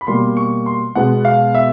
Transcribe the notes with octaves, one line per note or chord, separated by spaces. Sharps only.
B5
B2 G3 A#3 C6
C#6
C6
B2 G#3 B3 F#5
F5
E5